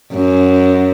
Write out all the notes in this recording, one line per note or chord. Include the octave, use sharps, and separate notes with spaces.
F#2